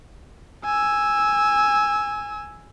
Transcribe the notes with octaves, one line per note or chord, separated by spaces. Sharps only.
G#5 E6